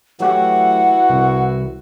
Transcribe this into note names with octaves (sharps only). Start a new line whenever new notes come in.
E3 F#3 A3 E4 F#4 G4 F#5
C2